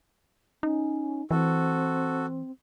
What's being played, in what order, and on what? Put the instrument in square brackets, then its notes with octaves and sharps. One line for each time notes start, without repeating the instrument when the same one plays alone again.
[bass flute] C#4 [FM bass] D#4
[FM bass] E3 [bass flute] C4 [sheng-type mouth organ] F#4 A4